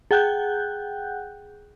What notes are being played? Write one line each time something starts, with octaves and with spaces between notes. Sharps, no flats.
G#4 F#5 G5 F#6 G6